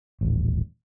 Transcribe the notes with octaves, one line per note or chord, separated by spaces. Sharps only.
D#1 A1